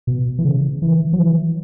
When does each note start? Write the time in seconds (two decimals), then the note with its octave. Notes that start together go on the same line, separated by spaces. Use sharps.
0.07 B2
0.39 E3
0.45 C#3
0.82 E3
1.13 F#3
1.19 E3